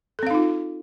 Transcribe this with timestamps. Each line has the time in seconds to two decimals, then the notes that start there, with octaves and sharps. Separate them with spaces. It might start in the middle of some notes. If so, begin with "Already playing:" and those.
0.19 A4
0.23 C4
0.27 F5
0.31 D#4
0.34 F4